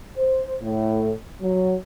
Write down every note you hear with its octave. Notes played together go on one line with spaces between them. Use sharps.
C5
A2
F#3